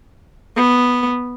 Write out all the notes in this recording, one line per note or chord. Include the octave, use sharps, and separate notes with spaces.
B3